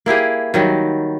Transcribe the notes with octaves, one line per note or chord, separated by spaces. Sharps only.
A#3 E4 G4 G#4
D#3 F#3 G3